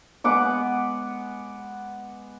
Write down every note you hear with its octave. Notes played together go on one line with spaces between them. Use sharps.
G#3 B3 F#5 D6